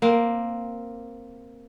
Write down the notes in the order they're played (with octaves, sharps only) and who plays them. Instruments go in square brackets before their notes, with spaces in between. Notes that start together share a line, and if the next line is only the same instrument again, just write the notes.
[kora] A#3 C4